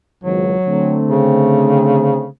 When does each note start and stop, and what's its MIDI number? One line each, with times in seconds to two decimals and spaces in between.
0.24 0.54 32
0.24 0.54 37
0.24 0.96 54
0.67 2.27 50
0.67 2.27 57
0.67 2.27 60
1.08 2.27 49